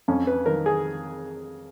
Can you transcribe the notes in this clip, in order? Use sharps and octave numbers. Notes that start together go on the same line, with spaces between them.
F2 C#4
B4
D#3 A#4
G#4